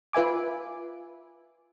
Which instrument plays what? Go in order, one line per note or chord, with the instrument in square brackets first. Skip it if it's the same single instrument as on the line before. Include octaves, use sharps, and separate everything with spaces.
[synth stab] F4 B4 E5 G#5 D6